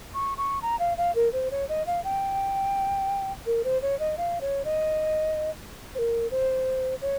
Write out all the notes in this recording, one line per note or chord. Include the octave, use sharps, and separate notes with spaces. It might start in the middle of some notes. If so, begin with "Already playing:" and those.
C#6
C#6
A#5
F5
F5
A#4
C5
C#5
D#5
F5
G5
A#4
C5
C#5
D#5
F5
C#5
D#5
C5
A#4
C5
C#5